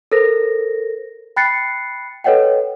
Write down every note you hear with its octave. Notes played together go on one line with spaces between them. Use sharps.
A4 A#4 C5 A#6
G5 B5 F#6 A6 C7 C#7
A4 B4 C#5 D#5 F#5 G5